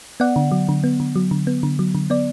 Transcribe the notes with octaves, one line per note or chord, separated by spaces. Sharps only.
B3 D5 F#5
D3
F#3
D3
B3
D3
F#3
D3
B3
D3
F#3
D3
B3 D5